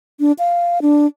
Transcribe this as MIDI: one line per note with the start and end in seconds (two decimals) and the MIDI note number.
0.20 0.32 62
0.39 0.79 77
0.82 1.06 62